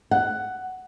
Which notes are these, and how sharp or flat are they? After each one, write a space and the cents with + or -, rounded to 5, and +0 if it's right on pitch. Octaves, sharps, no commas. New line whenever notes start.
F#5 +10